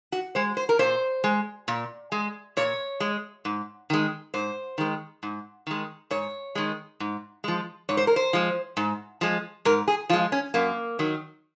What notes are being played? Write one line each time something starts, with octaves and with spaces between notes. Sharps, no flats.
F#4
G#3 C5
C5
A#4
A#2 C5
G#3
A#2
G#3
A#2 C#5
G#3
G#2
D#3 G#3
G#2 C5
D#3 G#3
G#2
D#3 G#3
G#2 C#5
D#3 G#3
G#2
F3 G#3
G#2 C#5
C5
A#4
C5
F3 G#3
G#2
F3 G#3
G#2 A#4
G#4
F3 G#3 F4
C#4
F#2 A#3
D#3 F#3